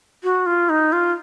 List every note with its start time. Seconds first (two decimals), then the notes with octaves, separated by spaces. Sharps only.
0.24 F#4
0.46 F4
0.69 D#4
0.93 F4